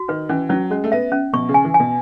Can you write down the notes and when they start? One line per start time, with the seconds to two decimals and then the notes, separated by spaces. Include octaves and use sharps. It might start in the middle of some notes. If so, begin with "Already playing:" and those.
Already playing: F#4
0.08 D#3 B4
0.29 E3 C#4
0.50 F#3 C#4
0.70 G#3 C#4
0.84 A3
0.92 B3 E5
1.12 C#4
1.33 B2 C#6
1.49 C#3
1.54 G#5
1.64 E3
1.74 G#5
1.80 B2